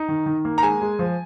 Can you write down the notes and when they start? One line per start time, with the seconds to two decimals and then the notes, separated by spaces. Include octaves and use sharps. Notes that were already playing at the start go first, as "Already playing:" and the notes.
Already playing: D#4
0.08 D#3
0.26 D#3
0.45 A#3
0.58 A#5
0.63 G#3 G#5
0.82 G#3
0.99 F3